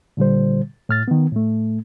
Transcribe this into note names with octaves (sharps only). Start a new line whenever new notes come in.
A#2 D3 G3 C5
A2 F6 A6
D#3 B3
A2 A3